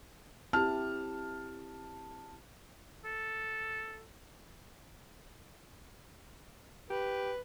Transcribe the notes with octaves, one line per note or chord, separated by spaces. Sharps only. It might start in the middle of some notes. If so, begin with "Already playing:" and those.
C4 E4 G4 A5 F6
A4
G4 B4